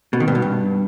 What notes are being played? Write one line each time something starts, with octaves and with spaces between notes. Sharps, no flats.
B2
D#3
G2
B2
G2